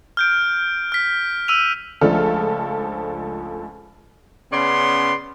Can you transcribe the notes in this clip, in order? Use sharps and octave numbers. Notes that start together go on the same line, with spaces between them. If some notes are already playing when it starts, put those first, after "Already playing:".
F6 G6 D7
F6 B6
E6 D#7 F7
C#2 F3 A3 D4 A4 F6
C#3 B3 C#4 D5 C6